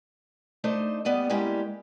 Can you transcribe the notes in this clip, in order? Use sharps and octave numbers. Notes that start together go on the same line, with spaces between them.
A3 D4 D#4 C5 D#5
G3 B3 D5 D#5
G3 G#3 A#3 C#4 E4 G4